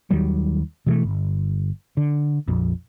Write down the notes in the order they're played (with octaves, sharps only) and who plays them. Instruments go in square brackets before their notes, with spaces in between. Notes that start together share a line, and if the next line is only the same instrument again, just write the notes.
[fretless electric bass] D#2 D#3 F#3 G3
B2 E3 F3 A3
G1
D3
A#1 F2